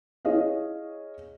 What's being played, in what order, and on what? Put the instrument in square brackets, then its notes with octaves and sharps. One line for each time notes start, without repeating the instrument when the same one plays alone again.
[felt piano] E4 G#4 C#5 D#5 F5